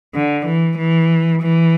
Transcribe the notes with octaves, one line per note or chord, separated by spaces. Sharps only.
D3
E3
E3
E3